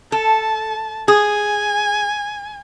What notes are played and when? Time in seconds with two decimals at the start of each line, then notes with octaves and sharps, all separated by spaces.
0.12 A4 A5
1.08 G#4 G#5